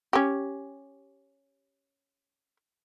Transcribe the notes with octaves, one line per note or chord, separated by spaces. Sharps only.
C#4 G4